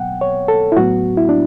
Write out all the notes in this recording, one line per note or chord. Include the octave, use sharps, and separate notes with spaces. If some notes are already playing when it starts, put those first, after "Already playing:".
Already playing: B2 F#3 B3 F#5 G5
C#5
A4
E4
A2 F#3 B3 F#4
E4
D4